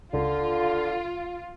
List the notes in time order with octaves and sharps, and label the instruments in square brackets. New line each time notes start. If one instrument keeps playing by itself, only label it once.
[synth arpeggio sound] C#2 [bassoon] D3 [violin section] F4